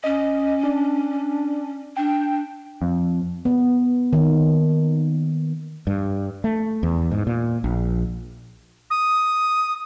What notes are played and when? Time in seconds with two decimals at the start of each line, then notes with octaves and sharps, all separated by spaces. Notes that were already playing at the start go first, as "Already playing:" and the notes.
0.04 C#4 D#5
0.64 D4
1.97 D4 G5
2.82 F2
3.45 B3
4.13 D#3
5.87 G2
6.44 A3
6.83 E2
7.12 G#2
7.27 A#2
7.64 A#1
8.90 D#6